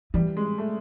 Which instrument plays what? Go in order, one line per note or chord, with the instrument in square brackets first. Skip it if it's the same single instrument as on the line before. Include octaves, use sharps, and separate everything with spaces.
[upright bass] E3 [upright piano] G3
[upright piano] G#3
A3